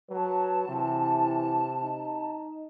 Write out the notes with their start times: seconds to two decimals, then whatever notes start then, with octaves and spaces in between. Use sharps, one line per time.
0.10 F#3 B4 A5
0.68 C3 E3
1.83 D#4